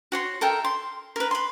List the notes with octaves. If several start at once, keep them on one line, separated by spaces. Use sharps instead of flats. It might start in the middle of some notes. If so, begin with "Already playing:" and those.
F#4 C#5 C6
A4 A#4 E5 G5
C6
A#4 B4
B5 C6